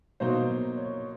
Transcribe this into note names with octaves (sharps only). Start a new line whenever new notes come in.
B2 F#3 A#3 D#4 C5
C#5